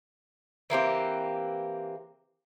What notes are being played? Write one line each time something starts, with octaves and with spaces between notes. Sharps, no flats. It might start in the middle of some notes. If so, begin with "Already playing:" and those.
E3 A#3 C4 G4